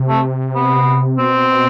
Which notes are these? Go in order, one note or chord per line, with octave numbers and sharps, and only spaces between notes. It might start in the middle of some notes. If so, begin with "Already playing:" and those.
Already playing: C3
A3
B3
B2 C4